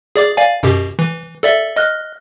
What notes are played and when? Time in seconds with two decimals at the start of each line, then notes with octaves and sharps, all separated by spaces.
0.16 G#4 D5 D6
0.37 D5 F5 G#5
0.63 F#2 B2 G4
0.99 E3
1.43 A4 D5 E5
1.76 D#5 F6 F#6